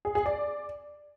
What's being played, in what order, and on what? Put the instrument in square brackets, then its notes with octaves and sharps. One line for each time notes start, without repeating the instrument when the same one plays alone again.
[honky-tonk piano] G#4
G#4
D5